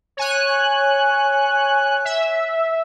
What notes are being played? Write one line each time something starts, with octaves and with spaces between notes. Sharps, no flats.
C#5 G#5 F#6
E5